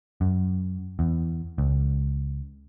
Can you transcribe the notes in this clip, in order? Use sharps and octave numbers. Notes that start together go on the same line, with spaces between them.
F#2
E2
C#2